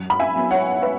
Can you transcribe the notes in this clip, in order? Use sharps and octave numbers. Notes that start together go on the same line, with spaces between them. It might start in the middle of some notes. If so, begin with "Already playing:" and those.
Already playing: F#2
B5
E5 G#5
F#3 B3
C#5 F#5
B4 E5